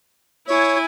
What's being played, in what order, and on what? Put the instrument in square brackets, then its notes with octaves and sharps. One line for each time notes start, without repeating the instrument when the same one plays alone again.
[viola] E4 G#5 [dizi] C#5